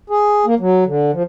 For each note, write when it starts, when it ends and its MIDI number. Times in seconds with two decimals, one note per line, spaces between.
0.10 0.46 68
0.46 0.55 58
0.59 0.84 54
0.86 1.11 50
1.13 1.23 53